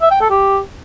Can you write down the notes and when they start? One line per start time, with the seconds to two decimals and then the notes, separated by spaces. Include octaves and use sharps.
0.02 E5
0.11 G5
0.21 A4
0.30 G4